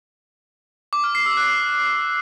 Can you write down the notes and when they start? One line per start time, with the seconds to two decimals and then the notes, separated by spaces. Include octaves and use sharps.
0.93 D6
1.04 F6
1.15 C7
1.26 E6
1.37 F#6